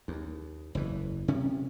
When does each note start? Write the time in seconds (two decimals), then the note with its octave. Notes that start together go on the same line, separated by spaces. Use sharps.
0.08 D#2
0.75 F#1 E2 E3
1.28 C3 C#4